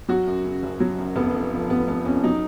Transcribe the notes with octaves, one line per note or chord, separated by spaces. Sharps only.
F#3 F#4
F#2
C#3
F#1
F#3
F#2
F1 B3
F2
F3
F1 B3
F1 B3
F2 C#4
F#3 D#4